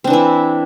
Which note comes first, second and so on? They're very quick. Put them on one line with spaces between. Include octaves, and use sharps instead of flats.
C4 D4 E3 E4